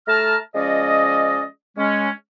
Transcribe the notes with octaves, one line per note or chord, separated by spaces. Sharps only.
A3 A5 A#5 F6
F3 G#3 C#4 D5 D#5
G#3 C#4